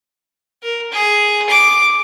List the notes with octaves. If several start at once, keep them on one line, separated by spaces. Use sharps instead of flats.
A#4
G#4
D6